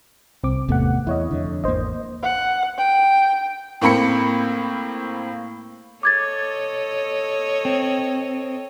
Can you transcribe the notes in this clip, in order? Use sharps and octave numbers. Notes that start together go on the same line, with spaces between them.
C2 C4 D6
G#1 E2 C3 A3 B3 F#5
E2 E4 C#5 D#5
F2 D3
G#1 E2 A#3 C5 D#5
F#5
G5
A2 A#3 C4 B5 C#7
A4 C#5 D#5 D6 G#6 A6
C4